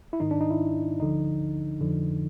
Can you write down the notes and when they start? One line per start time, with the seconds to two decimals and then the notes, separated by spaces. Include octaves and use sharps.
0.13 E4
0.20 G#2 D#3 D#4
0.31 D4
0.40 D#4
0.51 E4
1.00 D2 D3 F3 D#4
1.80 F2 D3 F3